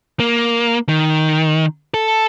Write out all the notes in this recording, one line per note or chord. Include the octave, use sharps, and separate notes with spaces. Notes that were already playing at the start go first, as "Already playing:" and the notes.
A#3
D#3
A4